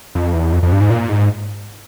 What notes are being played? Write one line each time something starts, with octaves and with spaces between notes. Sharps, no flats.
F2
E2
F2
F2
G2
G#2
A#2
G#2